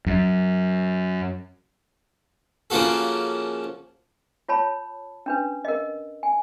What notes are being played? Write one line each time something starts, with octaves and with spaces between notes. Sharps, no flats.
F#2
C#3 F3 A#3 F#4 A4
F4 C#5 A5 B5
C#4 D4 B4
A#4 D#5
G#5